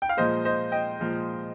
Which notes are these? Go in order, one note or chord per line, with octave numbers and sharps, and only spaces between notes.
G5
F5
A#2 F3 G#3 C5 D#5
C5 D#5
D#5 G5
A#2 F3 G#3